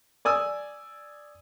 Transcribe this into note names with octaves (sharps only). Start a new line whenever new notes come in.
D5 G#5 D#6 E6